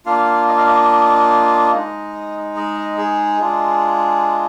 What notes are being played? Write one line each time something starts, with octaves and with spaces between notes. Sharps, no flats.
A#3 D4 F4 F5
D#5
F5
D#5
G#3 D#4
D#5
G#4
G#3 D4 F4